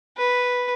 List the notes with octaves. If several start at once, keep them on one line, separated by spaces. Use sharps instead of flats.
B4